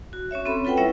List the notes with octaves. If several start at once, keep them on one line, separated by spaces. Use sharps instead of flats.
F#4
C#4 F#4 C#5 E5
C4 C#4 A4 B5
F4 A4 B4 F#5 G5
G3 C#4 E4 C#5 E5 F#5